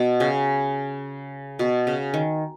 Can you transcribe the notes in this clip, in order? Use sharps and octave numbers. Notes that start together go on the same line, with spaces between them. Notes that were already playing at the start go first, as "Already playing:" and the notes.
Already playing: B2
C#3
B2
C#3
D#3